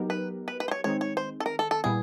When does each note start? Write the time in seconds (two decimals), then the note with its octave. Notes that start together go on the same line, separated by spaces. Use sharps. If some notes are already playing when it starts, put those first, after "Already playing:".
Already playing: F#3 B3 D#4 G4 A#4
0.10 B4
0.48 B4
0.60 B4
0.68 C5
0.71 C#5
0.84 D#3 G#3 C4 D#4 C#5
1.01 C#5
1.17 C5
1.40 A4
1.46 A#4
1.59 A4
1.71 A4
1.84 A#2 G3 B3 E4 G#4